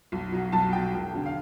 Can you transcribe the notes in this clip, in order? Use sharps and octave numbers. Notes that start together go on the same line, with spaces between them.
B1
B2 F#3
B1 A5
B2 F#3 G5
E1
D3 F#3
F5